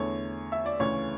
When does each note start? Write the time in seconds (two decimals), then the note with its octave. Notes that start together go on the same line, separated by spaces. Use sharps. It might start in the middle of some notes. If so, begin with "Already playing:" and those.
Already playing: E2 D3 A3 C#5
0.52 E5
0.66 D5
0.79 D2 C#3 E3 C#5